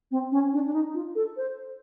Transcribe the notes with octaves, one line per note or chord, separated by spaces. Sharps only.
C4
C#4
D4
D4
D#4
F4
A4
C5